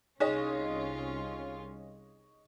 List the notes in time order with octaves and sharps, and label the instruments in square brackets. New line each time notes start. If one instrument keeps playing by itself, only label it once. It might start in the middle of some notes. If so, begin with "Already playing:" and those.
[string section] C2 C#4 F4 [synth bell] D#4 G#4 [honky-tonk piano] C#5 D#5